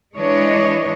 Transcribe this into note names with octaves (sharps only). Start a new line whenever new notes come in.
E3 G#3 D4 C#5 D#5